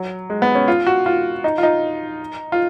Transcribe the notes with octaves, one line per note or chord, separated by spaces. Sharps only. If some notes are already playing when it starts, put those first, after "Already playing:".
Already playing: F#3
G#3
B3
C#4
F4
F#4
F4
D#4
F4
D#4
F4